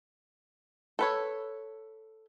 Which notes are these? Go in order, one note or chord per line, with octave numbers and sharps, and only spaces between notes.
A4 B4 C#5